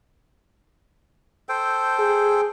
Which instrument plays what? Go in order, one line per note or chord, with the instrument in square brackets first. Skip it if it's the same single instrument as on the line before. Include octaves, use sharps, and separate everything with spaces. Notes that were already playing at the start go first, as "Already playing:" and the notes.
[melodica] A4 C5 G5
[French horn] G#4